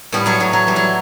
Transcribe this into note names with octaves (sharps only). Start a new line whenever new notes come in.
A2 G3 B3
F#3 A3
A2 F#3
F#3
E3 G3
F#3